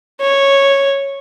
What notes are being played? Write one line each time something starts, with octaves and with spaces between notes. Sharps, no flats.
C#5